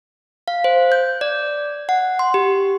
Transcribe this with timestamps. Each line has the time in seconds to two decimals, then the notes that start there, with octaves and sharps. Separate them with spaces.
0.48 F5
0.64 C5
0.92 G6
1.21 D5
1.89 F#5
2.19 C6
2.34 G4